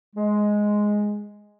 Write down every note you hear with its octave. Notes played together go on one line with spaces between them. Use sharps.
G#3